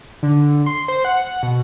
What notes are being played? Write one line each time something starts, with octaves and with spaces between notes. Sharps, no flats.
D3
C6
C5
F#5
B2